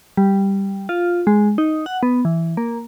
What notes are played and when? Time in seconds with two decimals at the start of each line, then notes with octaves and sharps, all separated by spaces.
0.17 G3
0.89 F4
1.27 G#3
1.58 D#4
1.86 F#5
2.03 B3
2.25 E3
2.57 A#3